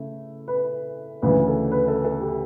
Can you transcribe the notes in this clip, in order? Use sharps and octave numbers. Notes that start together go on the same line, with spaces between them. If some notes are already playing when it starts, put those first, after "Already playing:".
Already playing: C#3 A3 E4
B4
D2 C#3 E3 B4
A4
B4
A4
A4
G4